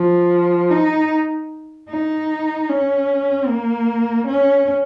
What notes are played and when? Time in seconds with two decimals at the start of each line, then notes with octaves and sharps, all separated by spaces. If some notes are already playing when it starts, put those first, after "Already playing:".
Already playing: F3
0.71 D#4
1.90 D#4
2.69 C#4
3.48 A#3
4.28 C#4